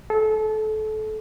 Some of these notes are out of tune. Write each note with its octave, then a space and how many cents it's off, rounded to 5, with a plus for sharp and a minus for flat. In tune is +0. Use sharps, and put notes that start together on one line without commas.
A4 -25